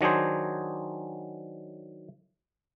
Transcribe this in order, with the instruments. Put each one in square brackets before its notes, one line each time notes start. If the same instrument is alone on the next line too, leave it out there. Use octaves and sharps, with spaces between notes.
[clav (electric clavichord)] D#3 F#3 D4 G#4 C5